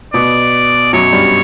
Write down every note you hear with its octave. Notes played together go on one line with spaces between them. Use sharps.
B2 B3 D5
F#2 F#3 C#5
G2 G3